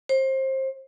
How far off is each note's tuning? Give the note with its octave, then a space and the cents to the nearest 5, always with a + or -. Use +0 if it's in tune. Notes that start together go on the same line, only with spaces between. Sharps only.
C5 +25